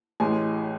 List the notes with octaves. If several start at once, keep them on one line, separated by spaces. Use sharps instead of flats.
A1 A2 G#3 G#5